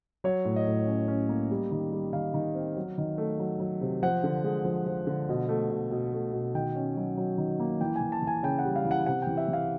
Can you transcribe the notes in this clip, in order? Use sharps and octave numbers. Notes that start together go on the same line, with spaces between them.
F#3 C#5
A2
D#5
A2
C#4
C#4
A#3
G3
D#3
G3
D#3 F5
D#3
C4
F#3
D#3
A3
F#3
F#3
C3
F3 F#5
D3
G#3
F3
F3
D3
B2
A3
B2
B2
A3
B2
D#3 G5
C#4
F#3
F#3
D#3
A#3
E3 G5
G#5
E3
A5
E3 G#5
C#3 G5
F#5
G3
F5
E3
F#5
C3 F#5
G5
E3
E5
E3 F5